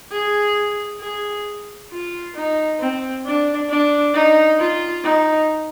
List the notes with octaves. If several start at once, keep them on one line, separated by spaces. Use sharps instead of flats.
G#4
G#4
F4
D#4
C4
D4
D4
D#4
F4
D#4